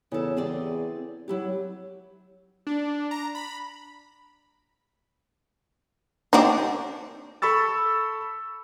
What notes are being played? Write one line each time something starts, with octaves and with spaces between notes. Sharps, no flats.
E2 C#3 A4
C4 G#4 D5
F#3 E4 G4
D4
A#5
B5
C4 D4 D#4 F#4 G4
A4 B5 C#6 E6 A6